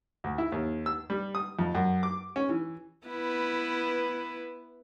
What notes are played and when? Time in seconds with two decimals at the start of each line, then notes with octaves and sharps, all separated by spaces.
0.24 D2
0.38 E4
0.52 D#2
0.86 E6
1.10 G3
1.35 D#6
1.59 F2
1.75 F#2
2.03 D6
2.36 C#4
2.49 E3
3.07 B3 E4 B4